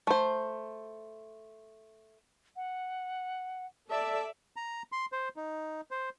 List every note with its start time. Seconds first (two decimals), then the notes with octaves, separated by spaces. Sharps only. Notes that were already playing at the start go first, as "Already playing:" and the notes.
0.07 A3 C5
2.56 F#5
3.90 A4 D5 E5 A5
4.56 A#5
4.92 C6
5.12 C5
5.36 D#4
5.91 C5